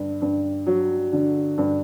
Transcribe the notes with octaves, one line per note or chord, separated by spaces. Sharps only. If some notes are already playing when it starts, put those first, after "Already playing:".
Already playing: G2 D3
G2
F#3
D3
G2